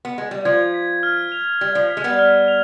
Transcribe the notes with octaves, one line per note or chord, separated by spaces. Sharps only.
B3
G#3
G3
F3 G#6
B6
F6
F7
G3 G#6
F3
B6
G#3
G3 B3
F6
F7